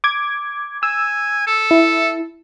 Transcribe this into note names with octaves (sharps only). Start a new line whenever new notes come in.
D6 G#6
G#5 E6
A4
E4